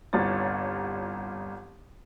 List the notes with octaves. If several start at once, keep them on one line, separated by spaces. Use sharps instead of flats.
G1 C2 F4 C#5 A6